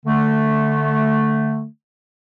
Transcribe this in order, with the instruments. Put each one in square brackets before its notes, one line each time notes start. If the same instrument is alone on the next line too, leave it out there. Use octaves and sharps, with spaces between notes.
[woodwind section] D3 A3